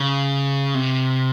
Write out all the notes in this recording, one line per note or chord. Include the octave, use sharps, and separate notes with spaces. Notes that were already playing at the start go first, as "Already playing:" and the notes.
Already playing: C#3
C3